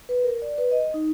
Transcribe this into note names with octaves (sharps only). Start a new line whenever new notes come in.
B4
A#4
D5
B4
D#5
D#4